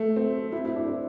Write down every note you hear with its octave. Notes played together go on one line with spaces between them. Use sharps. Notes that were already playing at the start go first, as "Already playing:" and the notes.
Already playing: A3
C4
E4
E4
D4
C4